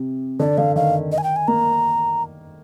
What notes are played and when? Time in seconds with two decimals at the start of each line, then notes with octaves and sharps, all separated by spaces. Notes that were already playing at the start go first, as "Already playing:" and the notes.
Already playing: C3
0.40 D3 D5
0.58 D3 F5
0.76 D#3 F5
1.12 D#5
1.18 G#5
1.24 G5
1.36 G#5
1.48 A#3 A#5